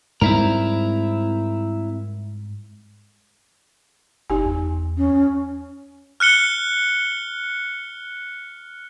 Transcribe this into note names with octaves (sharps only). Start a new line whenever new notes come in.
G#2 G3 C4 E4 A#4
F#1 D#4 G4 G#5
E2
C#4
F6 F#6 C#7 G7